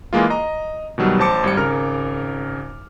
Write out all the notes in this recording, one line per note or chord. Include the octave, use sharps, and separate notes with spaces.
E3 G#3 A#3 F4
D#5 A#5
B2 D#3 F#3 G3
A1 C5 A5 D6 C#7
G#1 G3 C#7
G#1 C#3 A#4 A#5 F6